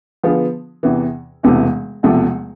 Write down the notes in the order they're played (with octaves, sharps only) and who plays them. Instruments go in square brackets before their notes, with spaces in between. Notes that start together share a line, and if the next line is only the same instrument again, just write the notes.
[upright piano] D3 F3 B3 F4 G#4
E2 C3 E3
E1 E2 C3 E3 A3
E1 E2 C3 F3 A3